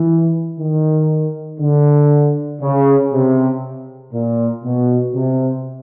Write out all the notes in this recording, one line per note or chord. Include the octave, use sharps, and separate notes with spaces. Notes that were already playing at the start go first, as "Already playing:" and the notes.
Already playing: E3
D#3
D3
C#3
C3
A#2
B2
C3